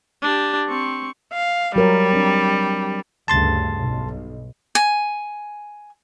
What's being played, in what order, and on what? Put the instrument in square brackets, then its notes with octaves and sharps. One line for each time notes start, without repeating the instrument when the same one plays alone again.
[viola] D4 G4
C4 C#6
[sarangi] F5
[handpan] F#3 A#4 C#5 [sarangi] G3
[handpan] C4 D4
[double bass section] D2 G2 C#3 [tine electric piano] A5 C6 A6
[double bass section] B1
[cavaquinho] G#5